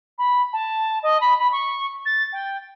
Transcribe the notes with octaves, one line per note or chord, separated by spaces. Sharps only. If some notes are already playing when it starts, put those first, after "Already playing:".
B5
A5
D#5
B5
B5
C#6
A6
G5